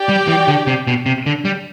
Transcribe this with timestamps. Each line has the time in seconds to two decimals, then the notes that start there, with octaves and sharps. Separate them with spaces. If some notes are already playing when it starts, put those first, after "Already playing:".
Already playing: G4 D5 G5
0.09 G3
0.28 E3
0.48 D3
0.67 C3
0.87 B2
1.06 C3
1.26 D3
1.45 G3